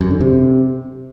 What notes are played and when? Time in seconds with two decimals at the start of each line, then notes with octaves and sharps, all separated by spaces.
0.01 F#2
0.11 D3
0.21 C3